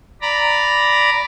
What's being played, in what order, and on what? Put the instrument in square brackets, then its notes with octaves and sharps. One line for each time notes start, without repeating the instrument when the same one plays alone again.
[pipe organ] D5 A#5 B5